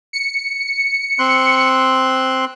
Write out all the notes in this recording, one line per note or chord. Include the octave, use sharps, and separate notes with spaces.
C#7
C4 C6 F#6